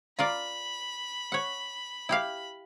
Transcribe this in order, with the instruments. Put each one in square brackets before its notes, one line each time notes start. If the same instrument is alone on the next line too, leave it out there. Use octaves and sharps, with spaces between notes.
[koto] F4 A#4 D5 [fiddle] B5
[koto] C#5 F#5
E4 G4 F5